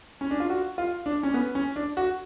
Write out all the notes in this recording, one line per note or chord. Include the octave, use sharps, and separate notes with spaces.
C#4
D4
F4
F#4
F4
D4
C#4
B3
C#4
D4
F#4